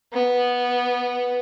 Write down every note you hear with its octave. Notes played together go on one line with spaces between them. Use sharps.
B3